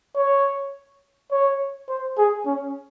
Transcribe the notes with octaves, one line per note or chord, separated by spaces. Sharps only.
C#5
C#5
C5
G#4
C#4